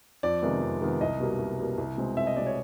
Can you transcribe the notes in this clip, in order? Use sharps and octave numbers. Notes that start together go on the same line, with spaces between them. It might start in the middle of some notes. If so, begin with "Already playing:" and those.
F2 D5
C3 D#3 G#3 B3
F2
C3 D#3 G#3 B3
C2 D#5
B2 G3 A#3
C2
B2 G3 A#3
C2
B2 G#3 C4
C2 E5
D#5
B2 G#3 C4 D5
C#5